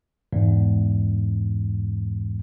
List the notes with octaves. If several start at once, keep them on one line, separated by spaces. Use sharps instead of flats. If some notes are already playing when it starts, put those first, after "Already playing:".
E2 G#2